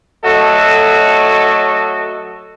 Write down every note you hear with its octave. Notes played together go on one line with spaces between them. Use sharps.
F#3 A3 F#4 A4 D#5